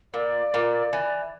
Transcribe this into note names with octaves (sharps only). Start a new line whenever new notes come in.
A#2 D5
A#2
E3